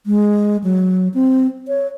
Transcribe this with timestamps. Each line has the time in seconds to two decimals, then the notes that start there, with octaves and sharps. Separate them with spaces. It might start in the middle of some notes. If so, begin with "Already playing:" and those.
0.06 G#3
0.64 F#3
1.14 C4
1.68 C#5